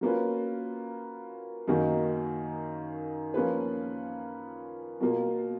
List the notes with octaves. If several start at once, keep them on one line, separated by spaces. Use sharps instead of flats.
F#3 A#3 C#4 F4 B4
F#2 D#3 A#3 D#4 F#4
F3 A#3 C#4 F4 B4
B2 F#3 A#3 F4